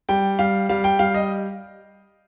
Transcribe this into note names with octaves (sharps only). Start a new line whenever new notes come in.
G3 G5
G3 F5
G3 F5
G5
G3 F5
D#5